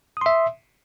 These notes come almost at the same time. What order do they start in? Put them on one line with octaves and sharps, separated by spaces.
D#6 C6 E5